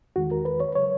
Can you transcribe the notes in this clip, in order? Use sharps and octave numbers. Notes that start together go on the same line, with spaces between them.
E2 D#3 G#3 F#4
A#4
B4
C#5
C#3 F#3 C#5